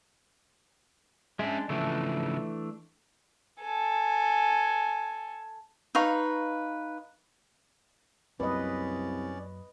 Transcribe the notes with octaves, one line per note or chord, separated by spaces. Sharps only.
G#3 C#4 D4 E5
C#3 E3 F3 A3 D4
A4 G#5
D#4 B4 F5 C#6
C2 F#2 F#3 A#3 C#4 B4 D5 D#5